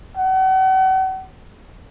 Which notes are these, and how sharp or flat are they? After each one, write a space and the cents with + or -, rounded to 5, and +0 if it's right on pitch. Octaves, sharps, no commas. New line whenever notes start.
F#5 +40